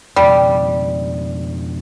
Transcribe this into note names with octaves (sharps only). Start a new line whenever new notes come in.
F2 B2 G3